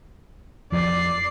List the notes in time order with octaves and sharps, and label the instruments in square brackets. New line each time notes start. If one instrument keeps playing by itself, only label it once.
[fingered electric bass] F2 F3 [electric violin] D5 C7